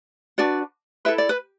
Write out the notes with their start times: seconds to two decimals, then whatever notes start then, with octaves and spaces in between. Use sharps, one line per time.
0.38 D4 F#4 B4 D5
1.05 E4 A4 B4 E5
1.18 D5
1.29 B4